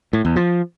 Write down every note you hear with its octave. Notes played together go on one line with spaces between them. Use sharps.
A2
E2
F3